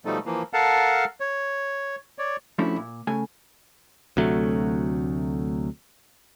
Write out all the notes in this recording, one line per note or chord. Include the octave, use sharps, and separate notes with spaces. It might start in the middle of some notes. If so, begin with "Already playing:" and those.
B2 F3 G3 A3 D#4 A4
E3 F3 A#3
A4 A#4 F5 F#5 A5
C#5
C#5 D5
F3 A3 C#4 D4 E4 F#4
A#2
C#3 A3 G#5
D2 C3 F#3 A3